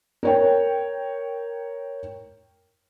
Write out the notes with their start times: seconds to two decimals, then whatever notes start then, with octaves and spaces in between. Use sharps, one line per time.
0.23 A#4 C#5 G5